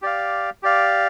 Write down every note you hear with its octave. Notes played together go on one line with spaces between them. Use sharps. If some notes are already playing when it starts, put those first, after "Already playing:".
G4 D5 F5
G4 D5 F5